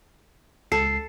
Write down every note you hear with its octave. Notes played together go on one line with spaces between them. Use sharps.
C#2 A4 C7